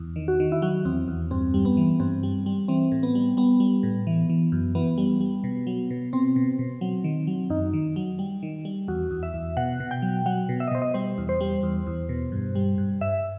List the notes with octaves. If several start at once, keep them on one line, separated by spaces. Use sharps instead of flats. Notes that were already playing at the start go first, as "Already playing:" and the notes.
Already playing: E2
D#3
F#4
D#3
E4
F#3 F#4
E2 C4
E2
G2 C4
G3
B3
E3
G2 C4
G3
G3
E3 C4
A2
B3
G3
G3 B3
G3
A2
E3
E3
F#2
E3 B3
G3
G3
B2
F#3
B2
B2 C4
B2
B2
F#3
D#3
F#3
F#2 D#4
D#3
F#3
G3
D#3
G3
E2 F#4
E2
E5
E2
B2 F#5
B2
G5
F#3
F#3 F#5
B2
E5
D#5
B2 C5
D#5
G3 C5
E2
C5
G3
E2
E2
B2
G2
G3
G2
G2 E5